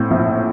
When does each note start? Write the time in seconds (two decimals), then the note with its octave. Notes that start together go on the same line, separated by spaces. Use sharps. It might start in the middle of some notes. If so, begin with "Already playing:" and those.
Already playing: A2 C4
0.11 A#1